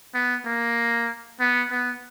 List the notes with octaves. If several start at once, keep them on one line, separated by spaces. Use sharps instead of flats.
B3
A#3
B3
B3